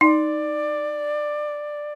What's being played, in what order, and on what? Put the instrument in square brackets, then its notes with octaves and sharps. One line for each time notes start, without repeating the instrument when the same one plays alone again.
[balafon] D#4 [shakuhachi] D5